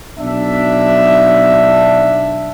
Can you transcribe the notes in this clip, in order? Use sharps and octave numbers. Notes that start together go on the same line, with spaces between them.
B1 D4 E5